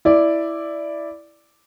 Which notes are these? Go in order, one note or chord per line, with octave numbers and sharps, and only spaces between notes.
E4 D5